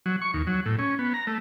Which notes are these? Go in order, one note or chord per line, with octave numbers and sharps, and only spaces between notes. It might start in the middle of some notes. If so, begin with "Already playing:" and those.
F#3
C#6
D#2
F#3
A2
C#4
B3
A#5
A3